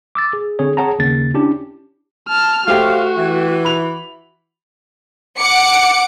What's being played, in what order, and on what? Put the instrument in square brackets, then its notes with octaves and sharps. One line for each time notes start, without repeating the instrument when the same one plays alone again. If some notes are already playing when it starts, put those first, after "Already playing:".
[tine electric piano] D6 E6 A6
G#4
D3 C4 G#4 C#5
G#4 C#5 F#5 A5 A#5
D#2 C#3 A6
C#4 D4 E4 G4
[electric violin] A5 F6
[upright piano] A3 G4 G5 [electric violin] F#4 [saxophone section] C5 C#5 F5
[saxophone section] E3
[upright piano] B5 F7
[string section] F#5 D6 C#7